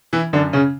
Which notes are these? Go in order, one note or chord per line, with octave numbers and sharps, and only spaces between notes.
E3 E4
F#2 D3 D4
C#3 C#4